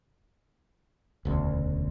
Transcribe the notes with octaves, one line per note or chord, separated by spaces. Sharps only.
E1 D2 C#3